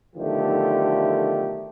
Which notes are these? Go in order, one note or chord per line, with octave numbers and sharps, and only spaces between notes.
B1 D3 D#3 F3 A3 G4